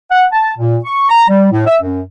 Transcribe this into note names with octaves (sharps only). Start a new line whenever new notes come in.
F#5
A5
A#2
C#6
A#5
G3
A2
E5
F#2